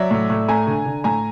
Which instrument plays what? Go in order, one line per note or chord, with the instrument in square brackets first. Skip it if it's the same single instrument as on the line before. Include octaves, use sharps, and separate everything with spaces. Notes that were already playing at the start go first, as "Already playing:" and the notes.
Already playing: [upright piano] F#3 D5 E5
A2
A2
A3 G#5 A#5
D3
D3
A2 G#5 A#5